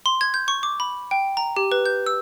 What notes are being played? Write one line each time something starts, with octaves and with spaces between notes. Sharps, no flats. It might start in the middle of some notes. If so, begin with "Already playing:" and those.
C6
G#6
G6
C#6
D6
B5
G5
A#5
G4
B4
G6
E6